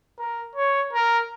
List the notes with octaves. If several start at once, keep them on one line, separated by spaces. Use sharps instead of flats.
A#4
C#5
A#4